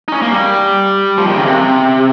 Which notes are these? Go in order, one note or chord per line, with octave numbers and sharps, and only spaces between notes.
D#4
C#4
A#3
G3
F3
D#3
C#3
C3